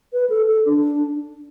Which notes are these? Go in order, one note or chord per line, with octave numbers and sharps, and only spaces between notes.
B4
A4
A4
D4